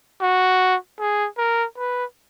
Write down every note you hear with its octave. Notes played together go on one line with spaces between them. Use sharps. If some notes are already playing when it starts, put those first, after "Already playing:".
F#4
G#4
A#4
B4